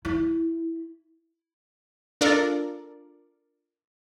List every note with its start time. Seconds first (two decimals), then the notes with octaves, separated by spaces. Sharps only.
0.05 E4
2.21 D4 F4 A4 A#4 D5